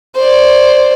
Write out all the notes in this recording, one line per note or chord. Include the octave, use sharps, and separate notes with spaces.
C5 D5